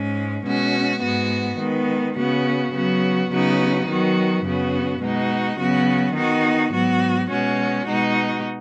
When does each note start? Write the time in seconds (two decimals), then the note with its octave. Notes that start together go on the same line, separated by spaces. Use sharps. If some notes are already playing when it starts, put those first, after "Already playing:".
Already playing: G#2 G#3 C#4
0.45 B2 G#3 C#4 F#4
1.01 G#2 G#3 B3 F#4
1.59 D#3 G#3 B3
2.15 C#3 B3 F#4
2.73 C#3 F#3 B3 F#4
3.30 C#3 F#3 B3 D#4 F#4
3.88 D#3 F#3 B3 F#4
4.44 F#2 C#3 B3 F#4
5.01 B2 G#3 D#4 F#4
5.58 C#3 F#3 B3 F#4
6.15 D#3 B3 D#4 F#4
6.72 G#2 F#3 B3 F#4
7.30 B2 G#3 C#4 F#4
7.86 B2 G#3 D#4 F#4